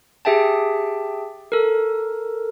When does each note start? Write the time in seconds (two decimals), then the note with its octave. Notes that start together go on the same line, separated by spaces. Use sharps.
0.25 G4 G#4 E5 G5 A5
1.52 A4 A#4